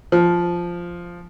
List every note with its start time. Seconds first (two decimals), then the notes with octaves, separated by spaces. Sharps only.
0.12 F3